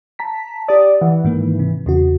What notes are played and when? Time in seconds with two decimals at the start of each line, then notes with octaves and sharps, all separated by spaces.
0.19 A5 A#5 B6
0.68 G4 D5 D#6
1.01 E3 F#5
1.24 G#2 D#3 A#3
1.60 C3
1.86 E2 C#3 F#4